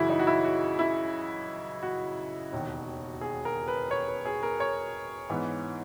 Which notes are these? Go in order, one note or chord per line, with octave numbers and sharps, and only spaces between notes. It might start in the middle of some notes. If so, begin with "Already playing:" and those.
Already playing: F#2 C#3 E3 E4 F#4
D#4
F#4
E4
F#4
E4
F#4
E1 D#2 D#3
G#4
A#4
B4
C#5
B4
G#4
A#4
C#5
G#2 E3 B3